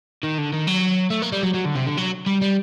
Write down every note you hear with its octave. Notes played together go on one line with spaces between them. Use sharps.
D#3
D3
D#3
F#3
A3
A#3
G3
F#3
F#3
D3
C3
D3
F#3
G3
G3